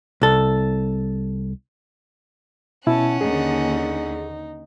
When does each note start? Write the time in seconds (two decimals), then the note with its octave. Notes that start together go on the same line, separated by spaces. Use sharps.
0.21 C2 A4
2.87 B2 C#4 E4 F#5 A5
3.21 D#2 D3 D#4 G#4